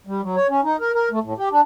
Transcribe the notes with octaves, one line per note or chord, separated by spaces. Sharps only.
G3
F#3
C#5
C#4
D#4
A#4
A#4
A3
A2
G4
D4